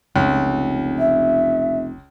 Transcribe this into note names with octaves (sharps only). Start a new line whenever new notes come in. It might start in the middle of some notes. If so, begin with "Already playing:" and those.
F1 C#2
E5